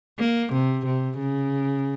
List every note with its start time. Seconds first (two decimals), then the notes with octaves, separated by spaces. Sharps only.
0.19 A#3
0.52 C3
0.86 C3
1.18 C#3